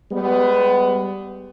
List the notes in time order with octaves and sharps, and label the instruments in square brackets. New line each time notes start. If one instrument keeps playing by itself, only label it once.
[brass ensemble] G3 G#3 B3